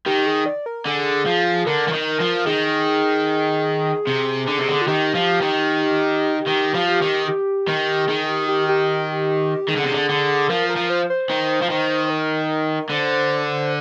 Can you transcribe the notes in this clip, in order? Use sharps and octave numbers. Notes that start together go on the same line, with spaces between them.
D#3 G4
G#4
D5
A#4
D3 G#4
F3
D3 A#4
F3
D#3
F3
D#3 G#4
C3
D3
C3
D3
F4
D#3 G4
F3
D#3
D#3
F3
D#3
G4
D#3
D#3 G#4
G4
G4
G4
D#3 G#4
D3
C3
D3
D3
F3 A#4
A#4
F3
C5
C5
D#3
F3
D#3
A#4
D3 C5